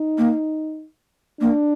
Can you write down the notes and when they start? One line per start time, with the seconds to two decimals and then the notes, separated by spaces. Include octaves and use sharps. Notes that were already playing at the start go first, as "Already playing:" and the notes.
Already playing: D#4
0.18 A#3
1.40 A#3 D4